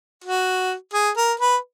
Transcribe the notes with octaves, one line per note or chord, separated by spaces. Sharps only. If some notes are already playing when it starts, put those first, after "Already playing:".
F#4
G#4
A#4
B4